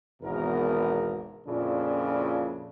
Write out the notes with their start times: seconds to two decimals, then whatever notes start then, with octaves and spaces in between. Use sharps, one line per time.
0.22 G#1 E2 B2 A#4
1.47 F2 A#2 C#3 D4 E4